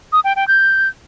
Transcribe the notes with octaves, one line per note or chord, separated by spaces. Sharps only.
D#6
G5
G5
G6